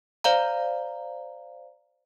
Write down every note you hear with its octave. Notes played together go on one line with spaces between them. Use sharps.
C5 D5 F5 A#5